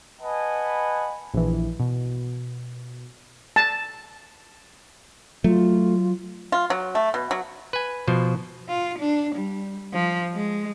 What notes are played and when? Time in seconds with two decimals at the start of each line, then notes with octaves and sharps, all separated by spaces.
0.20 B4 D#5 F#5 G#5 A5 B5
1.34 A#1 E3
1.80 B2
3.56 A5
5.44 F#3 A3 F4
6.52 F4
6.70 F#3
6.95 A3
7.14 B2
7.31 F#3
7.73 B4 G#5
8.08 B2 F3 C5
8.68 F4
8.99 D4
9.35 G3
9.93 F3
10.35 G#3